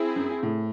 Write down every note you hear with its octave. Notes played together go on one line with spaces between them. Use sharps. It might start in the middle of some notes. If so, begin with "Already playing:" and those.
Already playing: C4 E4 G#4
F#2
A2